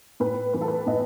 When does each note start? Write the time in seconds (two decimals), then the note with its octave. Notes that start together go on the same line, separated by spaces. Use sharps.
0.20 A2 B4
0.53 E3 B4
0.61 A4
0.68 B4
0.86 A2 D#5